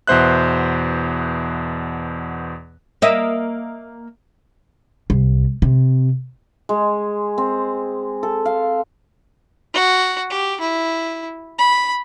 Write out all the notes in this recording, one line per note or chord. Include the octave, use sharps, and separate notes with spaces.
E2 B2 B3 C5 E5 F#6
A#3 D#5 E5
C2
C3
G#3
C4
A4
F5
F#4
G4
E4
B5